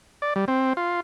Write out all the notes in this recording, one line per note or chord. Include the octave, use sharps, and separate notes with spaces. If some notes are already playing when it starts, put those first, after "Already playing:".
D5
G3
C4
F4